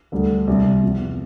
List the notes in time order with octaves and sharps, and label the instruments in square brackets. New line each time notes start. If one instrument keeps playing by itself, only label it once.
[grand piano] D2 D3 G3
C2 C3 G3
E2 C3 F3